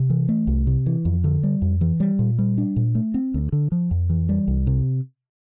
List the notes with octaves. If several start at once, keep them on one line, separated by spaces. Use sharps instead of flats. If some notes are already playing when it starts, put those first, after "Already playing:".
Already playing: C3
E3
A3
C2
C3
E3
F2
D3
G3
F2
E3
G3
A#2
G3
D4
A#2
A3
C4
D2
D3
F3
F2
E3
G3
C2
C3